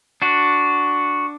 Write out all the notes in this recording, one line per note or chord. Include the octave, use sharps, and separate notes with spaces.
D4 F#4